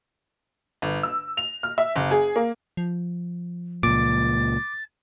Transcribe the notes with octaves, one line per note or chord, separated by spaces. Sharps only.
G1
E6
F7
F6
E5
F#1
G#4
A#3
F3
C#2 A#2 D6 A6